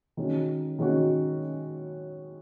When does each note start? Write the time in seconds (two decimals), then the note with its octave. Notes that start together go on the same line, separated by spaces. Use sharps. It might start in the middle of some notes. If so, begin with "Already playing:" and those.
0.17 D#3 G#3 C#4 F#4
0.79 D#3 G#3 C#4 F#4